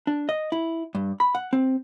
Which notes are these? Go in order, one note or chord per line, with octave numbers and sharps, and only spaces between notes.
D4
D#5
E4
G2
B5
F#5
C4